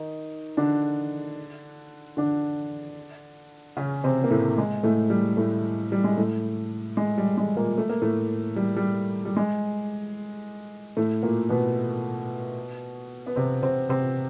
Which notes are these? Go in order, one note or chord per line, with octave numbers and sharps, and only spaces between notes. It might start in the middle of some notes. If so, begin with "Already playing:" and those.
Already playing: D#3 D#4
D3 D4
D3 D4
C#3 C#4
C3 C4
A#3
A2 A3
G#3
A2 A3
G3
A2 A3
G3
G#3
A2 A3
G#3
G3
G#3
A#2 A#3
A3
A#3
A2 A3
G3
G3
G3
G#3
A2 A3
A#2 A#3
B2 B3
B3
C3 C4
C3 C4
C3 C4